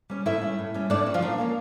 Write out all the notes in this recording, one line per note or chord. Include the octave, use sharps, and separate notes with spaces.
G3 C#4
A2 E4 E5
G3 C#4
A2
G3 C#4
A2 D4 D5
G3 C#4
F3 F4
A#2 D4
F3 A#3 C#4